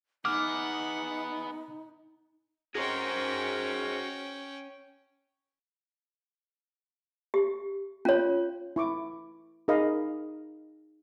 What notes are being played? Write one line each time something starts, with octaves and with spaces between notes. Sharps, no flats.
B3 D#4 G#4 F#5 D6 F6
C#4 F#4 G#4 A#4 C5 G5
G4
C#4 F4 C#5
E4 C#6 D6
D#4 G#4 A#4 D#5 F5 B5